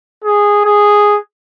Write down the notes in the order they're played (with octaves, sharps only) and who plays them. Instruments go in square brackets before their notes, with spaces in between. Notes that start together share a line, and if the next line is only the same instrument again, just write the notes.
[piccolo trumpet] G#4
G#4